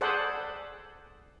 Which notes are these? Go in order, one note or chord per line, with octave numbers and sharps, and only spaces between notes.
G#4 A4 C5 D5 F#5 B5